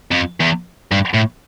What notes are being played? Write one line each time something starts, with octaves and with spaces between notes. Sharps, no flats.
F2
E2
G2
A2